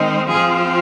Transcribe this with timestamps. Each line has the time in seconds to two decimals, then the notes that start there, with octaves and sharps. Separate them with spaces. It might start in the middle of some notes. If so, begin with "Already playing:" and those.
Already playing: D#3 G#3 C4 D#4
0.28 F3 C4 F4 G#4